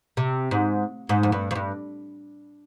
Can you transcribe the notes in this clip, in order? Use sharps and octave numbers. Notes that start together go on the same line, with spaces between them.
C3
G#2
G#2
F2
G2
F2
G2